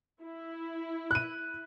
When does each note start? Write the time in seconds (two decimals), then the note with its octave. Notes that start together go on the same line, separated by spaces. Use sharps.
0.22 E4
1.11 F#6 D#7